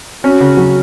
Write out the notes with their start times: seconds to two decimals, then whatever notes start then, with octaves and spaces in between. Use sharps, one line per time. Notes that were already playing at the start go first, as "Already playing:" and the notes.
0.24 C#4 F#4
0.40 C#3
0.57 F#3